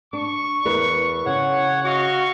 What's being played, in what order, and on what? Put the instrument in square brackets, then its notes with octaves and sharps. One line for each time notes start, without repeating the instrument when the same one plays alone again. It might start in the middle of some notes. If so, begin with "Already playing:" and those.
[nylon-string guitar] D4 [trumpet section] C#6
[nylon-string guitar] E2 A#4 B4
[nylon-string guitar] C#3 [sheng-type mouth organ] C#5 F#5
[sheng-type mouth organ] F#4 [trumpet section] D#5 F5 C#6